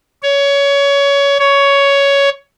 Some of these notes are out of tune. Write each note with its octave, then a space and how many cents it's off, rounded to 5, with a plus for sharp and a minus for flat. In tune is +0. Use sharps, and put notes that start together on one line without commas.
C#5 +20
C#5 +10